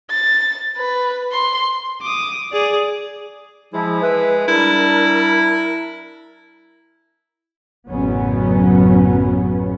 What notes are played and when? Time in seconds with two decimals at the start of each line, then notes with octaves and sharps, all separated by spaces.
0.10 A6
0.77 B4
1.32 C6
2.02 D6 D#6
2.52 G#4 D5
3.73 F3 G#3 E4
4.02 B4 E5
4.48 G3 D4 E4 A#4
7.90 A1 F#2 C#3 F#3 B3 C#4